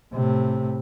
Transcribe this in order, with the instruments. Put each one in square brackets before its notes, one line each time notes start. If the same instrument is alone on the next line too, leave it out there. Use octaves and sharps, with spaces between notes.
[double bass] A2 C3